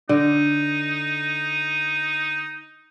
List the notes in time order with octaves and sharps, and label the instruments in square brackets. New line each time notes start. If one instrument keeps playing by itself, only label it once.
[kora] D3 [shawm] D#4